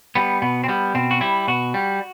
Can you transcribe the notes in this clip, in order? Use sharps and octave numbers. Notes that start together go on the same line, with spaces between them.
G3 B3
B2 B3
C4
G3 B3
B2 C4
F#4
G3 E4
B2 F#4
G3